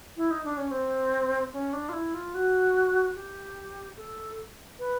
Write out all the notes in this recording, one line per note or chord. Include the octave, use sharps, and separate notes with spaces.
E4
D#4
D4
C#4
C4
C#4
D4
F4
E4
F4
F#4
G4
A4
B4